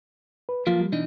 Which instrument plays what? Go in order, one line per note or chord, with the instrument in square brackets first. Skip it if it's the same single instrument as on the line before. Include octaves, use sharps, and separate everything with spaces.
[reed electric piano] B4
[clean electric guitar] F3 F#3 A#3 [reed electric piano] F4
[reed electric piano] G3
[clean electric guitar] B2 E3 D#4 [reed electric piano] D4